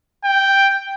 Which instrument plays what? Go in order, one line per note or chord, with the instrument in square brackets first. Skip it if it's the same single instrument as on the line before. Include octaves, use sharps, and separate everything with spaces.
[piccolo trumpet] G5